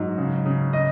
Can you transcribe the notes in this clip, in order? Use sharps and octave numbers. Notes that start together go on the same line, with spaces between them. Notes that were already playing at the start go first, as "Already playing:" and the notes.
Already playing: G#2 F#3
C#3
C#3
D#5